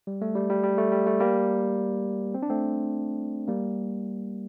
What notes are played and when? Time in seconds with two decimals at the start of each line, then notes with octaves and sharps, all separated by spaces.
0.07 G3
0.21 A3
0.35 G3
0.50 G3
0.64 G3
0.78 A3
0.92 G3
1.07 A3
1.20 G3 A#3
2.34 C4
2.42 D4
2.50 A3 C4
3.48 G3 A#3